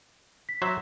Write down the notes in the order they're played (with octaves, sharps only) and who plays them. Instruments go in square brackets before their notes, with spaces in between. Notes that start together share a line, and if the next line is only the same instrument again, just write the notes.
[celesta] B6
[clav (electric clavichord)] F#3 C5 E5